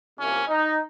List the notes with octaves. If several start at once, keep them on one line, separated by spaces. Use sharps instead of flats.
C2 C3 F3 A#3 C#4
D#4